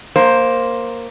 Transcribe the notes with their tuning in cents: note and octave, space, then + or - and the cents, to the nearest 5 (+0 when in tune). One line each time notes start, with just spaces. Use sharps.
A#3 +0 C5 +5